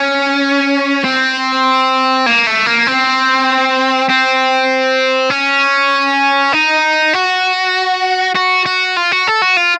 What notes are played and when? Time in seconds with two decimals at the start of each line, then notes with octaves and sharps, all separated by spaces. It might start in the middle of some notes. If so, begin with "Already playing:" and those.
Already playing: C#4
1.04 C4
2.26 A#3
2.47 A3
2.66 A#3
2.87 C4
4.10 C4
5.30 C#4
6.53 D#4
7.14 F#4
8.35 F#4
8.66 F#4
8.97 F4
9.12 F#4
9.28 A4
9.42 F#4
9.57 F4